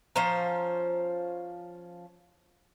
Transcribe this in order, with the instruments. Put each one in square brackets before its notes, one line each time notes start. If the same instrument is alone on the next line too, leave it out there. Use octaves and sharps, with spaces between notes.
[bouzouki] F3 C#4 C5 A#5